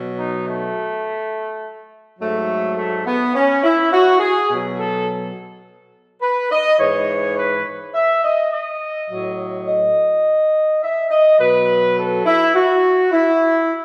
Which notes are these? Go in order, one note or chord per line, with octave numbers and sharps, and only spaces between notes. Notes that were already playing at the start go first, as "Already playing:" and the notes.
Already playing: B2 F#3
D#4
A3
G#2 F#3 A3
A3
B3
C#4
E4
F#4
G#4
B2 F#3
A4
B4
D#5
G#2 E3 C#5
B4
E5
D#5
D#5
A2 F#3
D#5
E5
D#5
B2 F#3 B4
A4
E4
F#4
E4